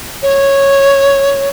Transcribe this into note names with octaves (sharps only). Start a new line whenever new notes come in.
C#5